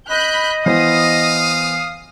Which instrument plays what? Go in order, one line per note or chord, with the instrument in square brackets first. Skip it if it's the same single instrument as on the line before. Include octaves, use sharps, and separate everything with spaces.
[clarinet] D#5 [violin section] B5 F#6 G6
[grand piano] E3 B3 C5 [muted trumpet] F5 [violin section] D#6